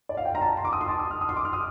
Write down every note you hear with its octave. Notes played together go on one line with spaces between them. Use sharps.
D5
F5
G5
A#5
A5
C6
D6
D#6
C6
A5
D#6
F6
D#6
C6
D6
F6
D#6